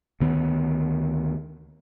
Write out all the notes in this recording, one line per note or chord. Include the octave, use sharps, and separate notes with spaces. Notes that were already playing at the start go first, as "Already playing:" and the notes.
D2 D#3 B3